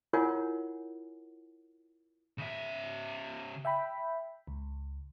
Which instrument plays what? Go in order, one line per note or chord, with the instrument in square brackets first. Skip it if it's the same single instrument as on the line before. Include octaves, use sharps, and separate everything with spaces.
[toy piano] E4 F4 A#4 C#5 F#5 G#5
[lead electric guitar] C#3 E5
[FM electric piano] E5 G5 B5
C#2